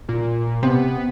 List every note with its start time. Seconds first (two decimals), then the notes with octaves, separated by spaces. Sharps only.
0.09 A#2
0.63 C3 B3